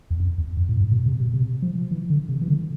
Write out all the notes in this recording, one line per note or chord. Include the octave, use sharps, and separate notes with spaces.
E2
F2
E2
F2
A2
G2
B2
C3
B2
C3
F3
E3
D3
C3
E3
D3